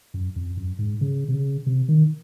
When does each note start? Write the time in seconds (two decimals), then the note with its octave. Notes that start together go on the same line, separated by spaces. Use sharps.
0.14 F#2
0.36 F2
0.57 F#2
0.79 G#2
1.01 C#3
1.28 C3
1.34 C#3
1.66 C3
1.88 D#3